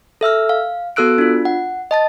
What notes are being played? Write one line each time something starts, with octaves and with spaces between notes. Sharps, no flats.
A4 E5 E6 F6
F5
B3 F#4 A4 E6 F#6 D7
D4 F4
F#5
D#5 A5 A6